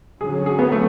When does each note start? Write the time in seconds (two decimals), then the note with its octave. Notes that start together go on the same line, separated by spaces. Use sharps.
0.21 D3 F#3 C#4 G#4
0.46 G#4
0.59 B3
0.72 A3